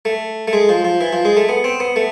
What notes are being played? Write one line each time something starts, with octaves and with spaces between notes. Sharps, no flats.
A3
A3
G#3
F3
F3
E3
F3
G#3
A3
B3
C4
B3
A3